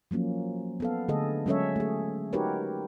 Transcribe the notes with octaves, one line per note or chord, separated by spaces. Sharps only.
F3 F#3 A#3 C#4
B3 A4 F5
D3 A3 G#4 A4 D#5
F#3 G#3 C#4 A4 C#5 E5
A3 G#4
D#4 F#4 G4 A#4 B4 C#5